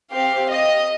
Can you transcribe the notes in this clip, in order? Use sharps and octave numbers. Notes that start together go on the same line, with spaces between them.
C4 G4 F5
D#5